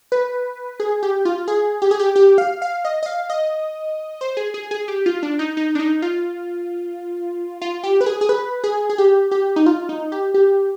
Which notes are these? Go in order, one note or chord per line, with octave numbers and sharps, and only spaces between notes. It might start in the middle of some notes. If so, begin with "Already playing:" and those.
B4
G#4
G4
F4
G#4
G4
G#4
G4
G4
F5
F5
D#5
D#5
F5
D#5
C5
G#4
G#4
G#4
G4
F4
D4
D#4
D#4
D4
D#4
F4
F4
G4
B4
G#4
G#4
B4
G#4
G#4
G4
G4
D#4
F4
D#4
G4
G4